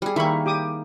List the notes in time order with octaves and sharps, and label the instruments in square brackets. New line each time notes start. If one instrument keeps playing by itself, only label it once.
[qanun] G3 G#4
[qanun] D#3 A#3 [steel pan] E4 B5 C#6
[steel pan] G4 D6 D#6